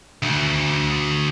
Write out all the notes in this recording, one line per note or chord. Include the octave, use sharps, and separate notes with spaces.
D2